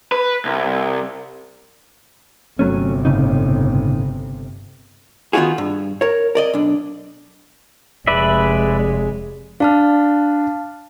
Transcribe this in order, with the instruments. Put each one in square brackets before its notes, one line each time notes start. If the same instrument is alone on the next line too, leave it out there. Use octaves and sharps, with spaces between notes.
[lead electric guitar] B4
C2
[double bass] G1 C3 [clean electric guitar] F#3 A3 C#4
[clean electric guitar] A2 C#3 D#4
[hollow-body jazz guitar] D#3 B3 D#4 F4 F#4 G#4
G2
A#4 C#5
A#4 D5 D#5
B1 D4
[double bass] F1 G#3 [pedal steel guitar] B4 D5 E5
[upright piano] D4 [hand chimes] F5 A5 F6